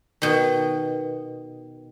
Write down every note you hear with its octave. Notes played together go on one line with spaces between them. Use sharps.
B2 D#3